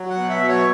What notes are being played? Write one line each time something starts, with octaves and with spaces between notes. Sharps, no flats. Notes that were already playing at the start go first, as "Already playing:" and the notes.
Already playing: F#3
F#5
B2
E5
F#3
C#5